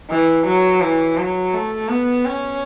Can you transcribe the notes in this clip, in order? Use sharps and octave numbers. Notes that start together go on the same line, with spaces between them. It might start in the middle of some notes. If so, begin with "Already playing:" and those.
E3
F#3
E3
F#3
A3
B3
C#4